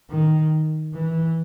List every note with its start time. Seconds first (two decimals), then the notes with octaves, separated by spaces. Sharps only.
0.10 D#3
0.93 E3